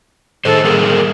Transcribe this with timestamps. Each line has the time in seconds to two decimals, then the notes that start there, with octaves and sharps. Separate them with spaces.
0.45 A2 D#3 G#4 A4 C5
0.64 G3 A#3 G#4 A#4